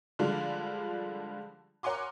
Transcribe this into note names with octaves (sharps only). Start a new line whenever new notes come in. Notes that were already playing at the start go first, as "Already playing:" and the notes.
D3 F3 G3 G#3 D4 F4
A#4 C#5 F#5 G#5 C6 D6